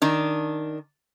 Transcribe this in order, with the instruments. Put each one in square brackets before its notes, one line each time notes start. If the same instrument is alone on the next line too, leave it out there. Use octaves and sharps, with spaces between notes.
[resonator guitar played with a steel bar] D#3 D4